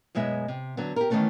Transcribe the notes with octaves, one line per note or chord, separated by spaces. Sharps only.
F#2 B2 G#3 B4 E5
C3
D3 F#3 B3
G4 A#4
D#3 E3 G3 A3 B3 C#4